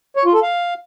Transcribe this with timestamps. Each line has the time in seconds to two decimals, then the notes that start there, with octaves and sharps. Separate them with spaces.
0.17 C#5
0.25 F4
0.34 A4
0.43 F5